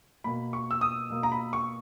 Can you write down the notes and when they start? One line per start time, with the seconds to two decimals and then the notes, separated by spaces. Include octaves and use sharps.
0.24 B2 A#3 B5
0.53 C#6
0.71 E6
0.81 D#6
1.10 B2 A#3
1.23 A#5
1.32 B5
1.53 C#6